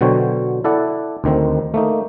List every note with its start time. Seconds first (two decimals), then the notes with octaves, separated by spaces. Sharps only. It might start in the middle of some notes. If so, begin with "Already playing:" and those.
0.01 B2 D3 F#3 C5 C#5 G5
0.64 E4 A4 D5 F#5
1.24 D2 D#3 C4
1.74 A3 A#3 D#4